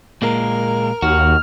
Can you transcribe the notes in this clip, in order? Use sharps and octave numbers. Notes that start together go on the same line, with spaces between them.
A#2 G#3 A#3 A#4
D#2 F#4 F6